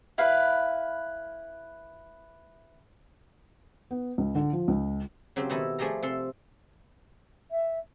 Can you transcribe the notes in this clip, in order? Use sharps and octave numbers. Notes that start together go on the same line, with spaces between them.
E4 B4 F5
B3
C#2
D3
F3
C#2
C#3 F#3 C4 G4
B2 D#3 E4 A4 D#5
F3 A3 G#4 D5 G5 A#5
C3 A4 C6
E5